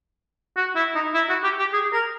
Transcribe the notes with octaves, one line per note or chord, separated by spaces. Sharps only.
F#4
E4
D#4
E4
F#4
G4
G4
G#4
A#4